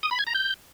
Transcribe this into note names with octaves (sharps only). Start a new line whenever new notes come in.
D#6
B5
G#6
A#5
G6